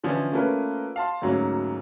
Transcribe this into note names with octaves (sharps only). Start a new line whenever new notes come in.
D3 E3 F3 C#4 C#5
A3 A#3 C#4 F4 A#4 B4
F5 A5 C6
D2 G#2 F#3 A#3 C#4